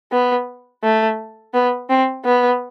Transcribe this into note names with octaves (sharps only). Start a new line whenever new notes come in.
B3
A3
B3
C4
B3